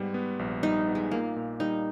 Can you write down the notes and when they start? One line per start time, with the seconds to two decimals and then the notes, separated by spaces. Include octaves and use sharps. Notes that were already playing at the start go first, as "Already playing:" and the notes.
Already playing: G#2 G3 B3
0.14 B3
0.39 A#1
0.63 G3 D#4
0.88 B3
0.95 G#3
1.11 A#2 A#3
1.36 A#2
1.60 G3 D#4